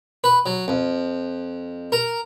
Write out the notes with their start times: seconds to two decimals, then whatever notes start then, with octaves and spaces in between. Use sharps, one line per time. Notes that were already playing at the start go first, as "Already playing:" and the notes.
0.24 B4
0.46 F#3
0.68 F2
1.92 A#4